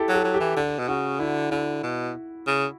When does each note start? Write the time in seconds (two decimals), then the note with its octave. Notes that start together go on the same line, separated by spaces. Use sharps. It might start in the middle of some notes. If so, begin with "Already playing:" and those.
Already playing: E4 G4 A4
0.08 F#3
0.14 A4
0.24 F#3
0.34 G4
0.40 E3
0.56 D3
0.78 B2
0.88 C#3 F#4
1.19 D3 E4
1.51 D3 E4
1.83 B2
2.47 C#3